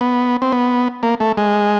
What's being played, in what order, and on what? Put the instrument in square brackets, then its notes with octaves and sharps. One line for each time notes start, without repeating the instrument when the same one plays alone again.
[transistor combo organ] B3
C4
B3
A#3
A3
G#3